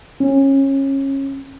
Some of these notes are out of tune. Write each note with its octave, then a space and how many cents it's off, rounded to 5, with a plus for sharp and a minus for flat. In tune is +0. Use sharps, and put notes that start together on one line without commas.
C#4 -25